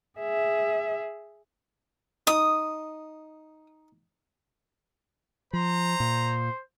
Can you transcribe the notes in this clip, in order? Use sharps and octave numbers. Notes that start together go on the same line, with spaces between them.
G#4 E5
D#4 D#6
F3 C5 A#5
A#2